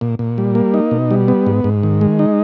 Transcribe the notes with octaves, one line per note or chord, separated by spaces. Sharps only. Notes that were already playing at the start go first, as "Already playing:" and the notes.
A#2
A#2
G3
A#3
D#4
B2
G3
B3
G#2
G#2
D#3
G#3
D#4